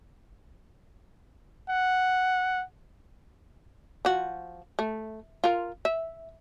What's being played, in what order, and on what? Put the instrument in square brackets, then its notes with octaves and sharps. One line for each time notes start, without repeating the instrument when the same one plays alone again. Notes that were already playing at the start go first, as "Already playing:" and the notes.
[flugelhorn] F#5
[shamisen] F3 F#4
A3
F4 A#4
E5